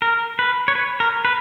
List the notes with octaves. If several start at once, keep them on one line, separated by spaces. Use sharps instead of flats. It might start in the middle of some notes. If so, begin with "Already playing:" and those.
A#4
B4
C#5
B4
A#4
B4